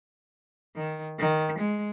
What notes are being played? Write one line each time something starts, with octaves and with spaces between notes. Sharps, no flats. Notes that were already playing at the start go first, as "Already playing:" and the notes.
D#3
D#3
G#3